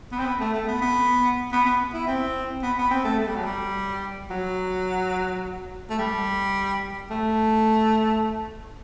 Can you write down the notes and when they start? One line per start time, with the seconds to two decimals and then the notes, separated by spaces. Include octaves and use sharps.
0.12 B3
0.19 C4
0.26 B3
0.40 A3
0.54 A3
0.68 B3
0.82 B3
1.52 B3
1.65 B3
1.93 E4
2.07 C4
2.63 B3
2.78 B3
2.91 C4
3.04 A3
3.19 A3
3.28 G3
3.36 F#3
3.45 G3
4.30 F#3
5.90 A3
5.99 G3
7.10 A3